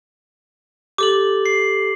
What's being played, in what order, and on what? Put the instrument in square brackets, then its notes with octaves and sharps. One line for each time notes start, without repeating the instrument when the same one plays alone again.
[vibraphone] G4 A4 [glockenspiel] D6 F#7
[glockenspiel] C7